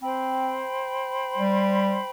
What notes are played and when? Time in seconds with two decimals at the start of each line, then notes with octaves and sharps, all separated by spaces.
0.02 C4 C5 G5 B5
1.37 G3